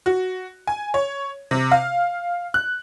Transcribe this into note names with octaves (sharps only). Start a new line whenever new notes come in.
F#4
G#5
C#5
C3
F5
F#6